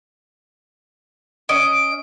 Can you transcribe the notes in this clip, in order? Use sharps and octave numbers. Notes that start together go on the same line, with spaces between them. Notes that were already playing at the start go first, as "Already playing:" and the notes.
C#4 D#5 D7